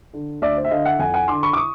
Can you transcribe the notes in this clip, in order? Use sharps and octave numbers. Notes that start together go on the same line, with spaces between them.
D3
D2 D5 E5
C5
E5
D3 D#5 F5
E5 F#5
F2 F#5 G#5
F#5 G#5
D3 C6 D6
B5 C#6
D6
C#6 D#6